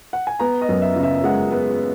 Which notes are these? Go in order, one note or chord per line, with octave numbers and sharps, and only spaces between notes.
F#5
G#5
B3 A#5
D#5
F#2
E5
C#3
E5
G#3 F#5
B3